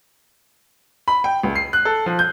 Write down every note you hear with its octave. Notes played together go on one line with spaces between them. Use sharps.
B5
G5
C#2
C7
F#6
A4
F3
G6